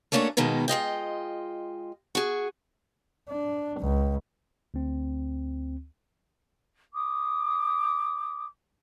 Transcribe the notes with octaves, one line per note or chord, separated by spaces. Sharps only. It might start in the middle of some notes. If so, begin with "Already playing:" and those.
A3 A#3 C#4 D4 F#4 C#5
B2 D#3 G#3 A#3 B3
G#3 F4 D#5 G5
F#4 G#4
D4
C#2
D2 C4
D6 D#6